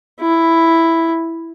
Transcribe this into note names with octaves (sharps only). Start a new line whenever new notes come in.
E4